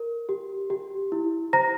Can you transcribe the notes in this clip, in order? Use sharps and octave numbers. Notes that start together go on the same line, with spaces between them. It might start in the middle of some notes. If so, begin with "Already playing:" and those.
Already playing: A#4
G4
G4
E4
C5 A#5 A#6